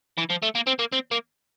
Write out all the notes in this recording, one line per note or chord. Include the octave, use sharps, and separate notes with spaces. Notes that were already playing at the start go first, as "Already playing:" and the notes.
E3
F3
A3
A#3
C4
A#3
C4
A#3